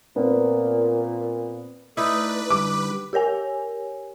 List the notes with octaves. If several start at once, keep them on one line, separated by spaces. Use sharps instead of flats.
A#2 B3 C4
A3 D#4 E4 B4 D5
D3 G3 D6
G4 A#4 C#5 G#5